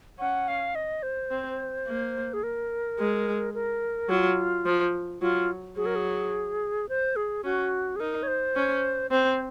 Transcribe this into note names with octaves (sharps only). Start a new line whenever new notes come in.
C#4 F#5
F5
D#5
C5
C4
A#3
G#4
A#4
G#3
A#4
F#3 F4
F3
F#3 F4
F#3 G#4
A#4
G#4
C5
G#4
C#4 F#4
G#4
D#4 A#4
C#5
C5
C#4
C4 C5